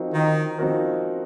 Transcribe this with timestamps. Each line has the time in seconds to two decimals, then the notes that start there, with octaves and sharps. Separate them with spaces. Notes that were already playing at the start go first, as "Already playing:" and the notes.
Already playing: F3 C4 D#4 F#4 A#4
0.14 D#3
0.59 F3 C4 D#4 F#4 A#4